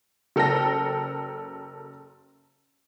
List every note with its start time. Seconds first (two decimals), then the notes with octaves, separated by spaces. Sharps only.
0.36 F#1 A4 A#4 G5 A#6